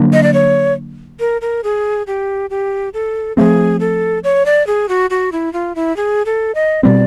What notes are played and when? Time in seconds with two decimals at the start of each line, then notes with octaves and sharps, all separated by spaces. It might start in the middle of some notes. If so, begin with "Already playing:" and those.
Already playing: D3 F#3 A#3 D4
0.13 D#5
0.23 D5
0.34 C#5
1.20 A#4
1.41 A#4
1.64 G#4
2.07 G4
2.50 G4
2.94 A4
3.37 F3 A3 C4 G#4
3.80 A4
4.24 C#5
4.46 D5
4.67 G#4
4.89 F#4
5.10 F#4
5.32 E4
5.53 F4
5.76 E4
5.97 G#4
6.26 A4
6.55 D#5
6.83 B2 G3 C4 D5